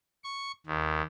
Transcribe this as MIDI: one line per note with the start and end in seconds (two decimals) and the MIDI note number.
0.24 0.52 85
0.66 1.02 39